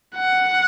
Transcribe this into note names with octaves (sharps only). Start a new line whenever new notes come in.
F#5